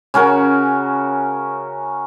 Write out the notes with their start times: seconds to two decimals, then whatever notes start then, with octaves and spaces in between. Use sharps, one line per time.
0.14 C#3 C#4 F#4 A#4